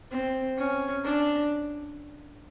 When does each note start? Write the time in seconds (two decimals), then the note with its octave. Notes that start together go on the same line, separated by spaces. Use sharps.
0.12 C4
0.58 C#4
1.05 D4